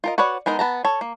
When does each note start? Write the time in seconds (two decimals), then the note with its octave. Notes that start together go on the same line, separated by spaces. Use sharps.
0.04 F4 A#4 D#5
0.18 F#4 B4 C#5 D5 F#5
0.46 G#3 B3 D#4 A#4
0.59 B3 A5 A#5
0.84 A4 C#5
1.01 A#3